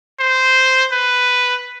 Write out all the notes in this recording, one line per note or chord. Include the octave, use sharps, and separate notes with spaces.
C5
B4